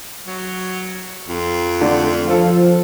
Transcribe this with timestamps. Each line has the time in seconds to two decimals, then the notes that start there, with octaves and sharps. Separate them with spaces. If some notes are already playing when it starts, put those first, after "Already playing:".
0.27 F#3
1.29 F2
1.81 D3 A3 D4
2.27 F3 F4 A4